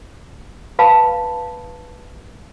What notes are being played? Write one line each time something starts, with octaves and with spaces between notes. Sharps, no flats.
B4 F5 A5 B5